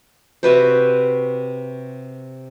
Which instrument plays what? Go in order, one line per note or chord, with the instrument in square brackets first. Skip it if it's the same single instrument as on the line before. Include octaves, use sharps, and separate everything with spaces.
[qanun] C3 F#4 B4 C5